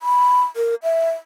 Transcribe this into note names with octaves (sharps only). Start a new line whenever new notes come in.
B5
A#4
E5